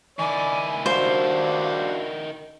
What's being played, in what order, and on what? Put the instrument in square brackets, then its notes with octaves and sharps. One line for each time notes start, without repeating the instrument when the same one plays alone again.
[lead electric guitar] D#3 E4 [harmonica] D5 [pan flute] G#5
[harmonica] G3 D4 F#4 [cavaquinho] C5 [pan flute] F5